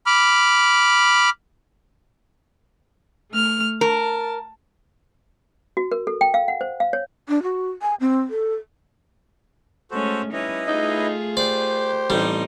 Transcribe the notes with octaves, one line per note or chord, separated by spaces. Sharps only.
B5 D6 F6
A3 F6
A#4 A5
F#4
A#4
A4
G5
F5
F#5
C5
F5
C#5
D4
F#4
G#5
C4
A4
G#3 A3 C#4 F#4 A4 C5
G3 C#4 D#4 E4 B4 D#5
A3 D#4 F4 G#4
G4 C5 D5
A1 G3 A3 C4 D#4